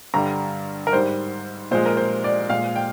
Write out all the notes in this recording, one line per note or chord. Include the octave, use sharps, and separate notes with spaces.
G2 D3 G3 A#5
A#4
G#2 G3 C5
A#2 F3 G#3 C5
A#4
C5
D5
A#2 G#3 F5
G5